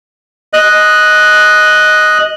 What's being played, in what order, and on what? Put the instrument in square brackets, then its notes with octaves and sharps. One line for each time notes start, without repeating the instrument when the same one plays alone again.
[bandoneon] D#5 F#6